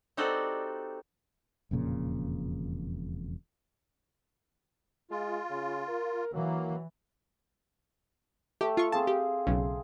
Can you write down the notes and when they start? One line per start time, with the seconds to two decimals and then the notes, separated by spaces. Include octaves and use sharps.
0.17 C4 D#4 F#4 G4 A4 D5
1.71 E1 F2 A#2 C#3
5.11 G#3 F4
5.50 C#3
5.88 A#4
6.34 E3 F#3 A#3
8.61 A3 G4
8.77 F4 C#6
8.92 C4 G#4 F5 A5
9.07 G4
9.47 B1 C#3